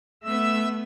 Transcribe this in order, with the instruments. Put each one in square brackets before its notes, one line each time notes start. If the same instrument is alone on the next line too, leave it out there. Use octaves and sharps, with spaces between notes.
[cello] A3 B3 [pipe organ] E5 E6